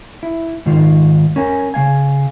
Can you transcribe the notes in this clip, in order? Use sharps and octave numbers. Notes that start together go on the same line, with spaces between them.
E4
G#2 D#3 F4
C#4 A#4 G#5
C#3 A3 F5 G#5